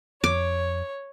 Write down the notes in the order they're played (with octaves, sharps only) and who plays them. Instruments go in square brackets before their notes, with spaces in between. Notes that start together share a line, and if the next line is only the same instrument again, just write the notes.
[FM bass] F2 [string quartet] C#5 [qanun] D6